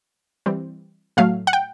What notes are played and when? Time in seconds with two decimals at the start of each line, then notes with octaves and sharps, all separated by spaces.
0.46 E3 G3 C4
1.17 A2 F#3 A3 F5
1.47 F#5
1.53 G5